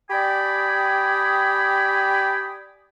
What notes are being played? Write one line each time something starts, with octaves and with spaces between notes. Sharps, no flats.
G4 D5 G5 G#5 B5 D#6